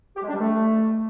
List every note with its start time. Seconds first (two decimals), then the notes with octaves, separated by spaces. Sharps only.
0.16 G4
0.22 G#3
0.28 D4
0.34 G3
0.40 A3